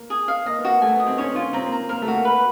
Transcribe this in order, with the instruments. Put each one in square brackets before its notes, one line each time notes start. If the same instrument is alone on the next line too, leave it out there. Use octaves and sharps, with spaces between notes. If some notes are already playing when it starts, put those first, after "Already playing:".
Already playing: [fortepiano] A#3
[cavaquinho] G#4
F5
[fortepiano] A#3 [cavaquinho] D#5
[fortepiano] B3
[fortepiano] A#3 [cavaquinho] F#4
[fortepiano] A3 [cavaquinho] G#5
[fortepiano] B3
[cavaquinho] D#5
[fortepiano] C4
[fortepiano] C#4 [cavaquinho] C#5
[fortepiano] C#4 [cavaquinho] F4
[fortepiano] C4 [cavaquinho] A#5
[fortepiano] A#3
[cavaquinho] A#5
[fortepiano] A#3 [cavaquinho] A#4
[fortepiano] A3
[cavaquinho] F#4
[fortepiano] A#3
[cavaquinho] B4